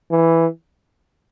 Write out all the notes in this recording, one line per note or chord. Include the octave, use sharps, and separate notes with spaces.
E3